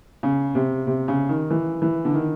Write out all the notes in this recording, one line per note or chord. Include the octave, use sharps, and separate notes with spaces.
C#3
C3
C3
C#3
D#3
E3
E3
D3
D#3